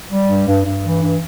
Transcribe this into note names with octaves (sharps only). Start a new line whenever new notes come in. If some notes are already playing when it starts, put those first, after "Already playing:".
G3
G2
G2
G2
E3
G2